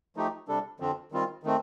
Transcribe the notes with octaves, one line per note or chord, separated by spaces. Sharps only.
F3 A3 D#4 G4
C3 G3 D4 A4
F2 D3 F3 C4
D#3 G3 C4 F4
D#3 A3 C4